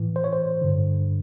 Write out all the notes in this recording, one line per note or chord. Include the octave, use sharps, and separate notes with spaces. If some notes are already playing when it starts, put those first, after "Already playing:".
Already playing: A2 E3
C5
C#5
C5
G2 D3